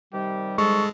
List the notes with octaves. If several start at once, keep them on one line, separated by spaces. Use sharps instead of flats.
C3 D#3 G3 G4
G#3 A4 C#6